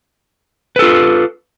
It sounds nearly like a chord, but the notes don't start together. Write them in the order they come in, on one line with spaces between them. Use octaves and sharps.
B4 A4 F4